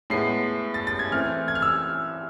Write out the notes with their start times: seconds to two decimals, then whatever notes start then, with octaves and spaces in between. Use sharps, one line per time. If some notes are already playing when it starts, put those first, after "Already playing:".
0.10 A2 G#3 B3 C7
0.74 A6
0.87 A6
0.99 G#6
1.11 E3 A3 C4 F6
1.48 G#6
1.55 F6
1.62 E6